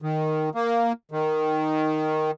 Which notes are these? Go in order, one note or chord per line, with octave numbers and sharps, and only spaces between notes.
D#3
A#3
D#3